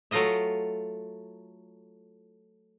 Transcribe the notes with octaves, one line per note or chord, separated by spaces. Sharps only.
F#3 A3 F4 D#5 E5